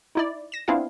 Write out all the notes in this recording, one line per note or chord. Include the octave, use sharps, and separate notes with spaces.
D#4 E4 D5
A#6 E7
B3 C4 D4 E4 F4 F5